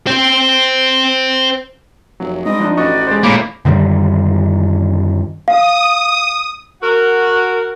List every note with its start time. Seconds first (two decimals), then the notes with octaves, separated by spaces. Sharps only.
0.07 C5 G5
2.20 F1 F#3
2.46 G#2 G3 C4 D#5
2.60 F3 D4 D#4
2.77 A1 D#4 F#4 B4 D5 D#5 C#6
3.07 G#3 C5
3.23 A2 A#3 C#5 B5 D6
3.65 F#2 D3 D#3 G3
5.48 F5 D#6
6.82 F#4 A#4